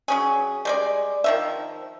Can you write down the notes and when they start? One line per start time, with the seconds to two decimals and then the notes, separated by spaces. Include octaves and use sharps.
0.08 F#3 C#4 G#4
0.65 G3 G#3 D5
1.24 D#3 F3 E5